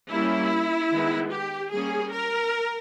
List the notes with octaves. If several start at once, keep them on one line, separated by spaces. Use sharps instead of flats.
G3 A#3 C#4 E4
D#3 G#3 B3
G4
G3 A#3 C#4 G#4
A#4